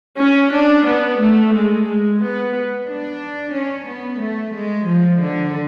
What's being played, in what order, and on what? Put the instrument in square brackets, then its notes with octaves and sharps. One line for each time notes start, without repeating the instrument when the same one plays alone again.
[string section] C#4
D4
B3
A3
G#3
G#3
B3
D4
C#4
B3
A3
G#3
F3
D3